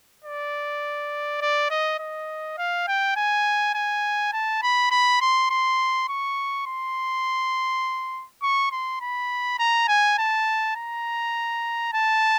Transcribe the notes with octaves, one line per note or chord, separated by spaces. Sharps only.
D5
D5
D#5
D#5
F5
G5
G#5
G#5
A5
B5
B5
C6
C6
C#6
C6
C#6
C6
B5
A#5
G#5
A5
A#5
A5